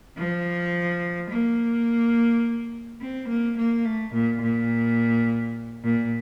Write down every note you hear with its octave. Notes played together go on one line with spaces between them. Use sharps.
F3
A#3
C4
A#3
A#3
A3
A#2
A#2
A#2